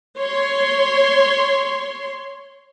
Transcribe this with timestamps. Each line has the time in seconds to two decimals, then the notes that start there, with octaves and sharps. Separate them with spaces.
0.18 C#5 C6